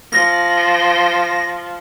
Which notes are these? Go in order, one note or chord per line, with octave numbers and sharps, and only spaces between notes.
F3 A#6